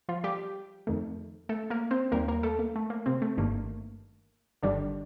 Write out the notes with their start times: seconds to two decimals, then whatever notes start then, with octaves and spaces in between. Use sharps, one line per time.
0.09 F3 F4
0.24 G3 G4
0.87 F2 D#3 A3
1.49 A3 A4
1.70 A#3 A#4
1.91 C4 C5
2.12 D#2 D#3 G3 A#3 A#4
2.28 A#3 A#4
2.43 A3 A4
2.59 A#3
2.75 A3
2.90 A#3
3.06 C3 C4
3.22 A3
3.37 G1 G2 D#3 A3 A#3
4.63 G1 G2 D3 D#3 G3 D4